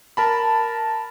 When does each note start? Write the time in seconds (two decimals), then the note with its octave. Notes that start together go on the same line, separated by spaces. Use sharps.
0.17 A#4 A5 B5